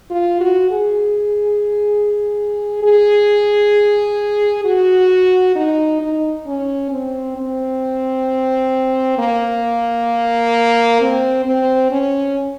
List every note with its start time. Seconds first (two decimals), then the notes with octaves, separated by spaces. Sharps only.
0.10 F4
0.41 F#4
0.70 G#4
2.83 G#4
4.65 F#4
5.56 D#4
6.01 D#4
6.46 C#4
6.91 C4
7.37 C4
9.18 A#3
11.01 C4
11.46 C4
11.91 C#4